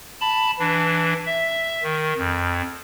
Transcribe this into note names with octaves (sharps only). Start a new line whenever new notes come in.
A5 B5
E3 D4
E5
D#3
F2